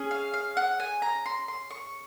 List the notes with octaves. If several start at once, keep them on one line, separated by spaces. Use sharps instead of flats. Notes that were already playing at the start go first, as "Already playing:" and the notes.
Already playing: C#4 G#4
F5
F5
F#5
G#5
A#5
C6
C6
C#6